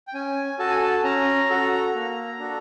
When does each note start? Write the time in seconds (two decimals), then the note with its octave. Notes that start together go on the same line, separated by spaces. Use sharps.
0.07 G5
0.14 C#4 G#5
0.59 F#4 A4 A5
0.70 G#5
0.82 A5
1.04 C#4 A#5
1.50 F#4 A4
1.95 A#3
2.39 D4 F#4 A4